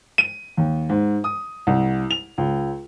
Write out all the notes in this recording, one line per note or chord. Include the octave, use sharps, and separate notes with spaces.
D#7
D#2
G#2
D#6
C2
F7
C#2